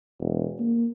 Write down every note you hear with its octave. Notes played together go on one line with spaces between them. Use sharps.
E1
A#3